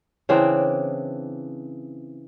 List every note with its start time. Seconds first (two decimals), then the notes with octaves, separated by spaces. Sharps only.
0.29 C#3 E3 C4 D4